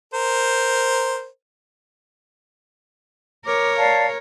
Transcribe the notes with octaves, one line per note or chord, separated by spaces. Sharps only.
A#4 C5
A#4 C#5 D6
D5 F5 A5